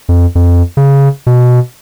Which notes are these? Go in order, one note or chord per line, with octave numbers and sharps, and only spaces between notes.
F2
F2
C#3
B2